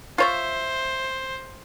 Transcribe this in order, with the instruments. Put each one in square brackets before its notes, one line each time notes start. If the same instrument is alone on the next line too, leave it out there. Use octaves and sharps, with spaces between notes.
[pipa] F4 C#5 E5 [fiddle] C5